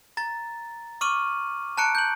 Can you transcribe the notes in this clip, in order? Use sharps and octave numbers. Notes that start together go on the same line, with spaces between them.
A#5 A6
C#6 D6 F6 D#7 F#7
A5 A#5 F#6 C#7 D7
G6 F#7